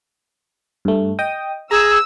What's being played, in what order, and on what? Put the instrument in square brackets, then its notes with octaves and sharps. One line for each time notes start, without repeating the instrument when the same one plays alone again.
[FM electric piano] G2 A3
D#5 G5 D#6
[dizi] G#4 [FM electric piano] A#5 [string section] E6